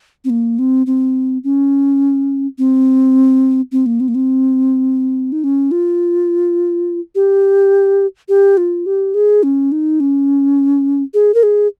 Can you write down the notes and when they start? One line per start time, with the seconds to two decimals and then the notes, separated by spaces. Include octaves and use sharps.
0.25 C4
0.30 A#3
0.59 C4
0.87 C4
1.44 C#4
2.58 C4
3.72 C4
3.86 A#3
4.00 C4
4.08 A#3
4.15 C4
5.32 D#4
5.44 C#4
5.71 F4
7.15 G4
8.29 G4
8.57 F4
8.86 G4
9.14 G#4
9.43 C#4
9.72 D#4
10.00 C#4
11.14 G#4
11.34 A#4
11.43 G#4